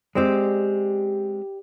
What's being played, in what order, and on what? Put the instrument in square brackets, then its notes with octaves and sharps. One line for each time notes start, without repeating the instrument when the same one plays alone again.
[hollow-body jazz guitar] G#3 C4 [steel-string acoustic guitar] G4 D5